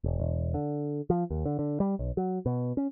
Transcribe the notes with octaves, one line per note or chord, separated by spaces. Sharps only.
E1
E1
D3
F3
D#2
D3
D3
G3
B1
F#3
B2
C#4